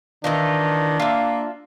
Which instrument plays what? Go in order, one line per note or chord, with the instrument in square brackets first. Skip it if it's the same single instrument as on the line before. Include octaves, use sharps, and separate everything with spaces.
[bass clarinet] D#3 [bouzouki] E3 D#4 F4 [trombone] D4
[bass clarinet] A#3 [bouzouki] F4 E5